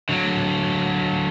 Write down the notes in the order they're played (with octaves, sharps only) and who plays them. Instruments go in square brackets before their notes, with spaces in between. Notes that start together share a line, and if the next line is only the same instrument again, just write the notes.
[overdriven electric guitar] D3 F#3